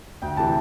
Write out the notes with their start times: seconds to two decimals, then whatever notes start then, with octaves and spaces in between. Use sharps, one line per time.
0.22 D2 G5
0.37 C3 E3 A5